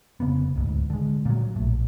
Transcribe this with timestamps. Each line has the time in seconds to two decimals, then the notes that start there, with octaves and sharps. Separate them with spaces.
0.20 F1 C#3 A#3 B3
0.56 D1 D2 G#2
0.90 D3 G#3
1.25 A#2 F#3
1.56 A#1 A2